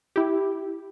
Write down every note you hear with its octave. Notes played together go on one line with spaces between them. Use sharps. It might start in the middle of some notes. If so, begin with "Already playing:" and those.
E4 G4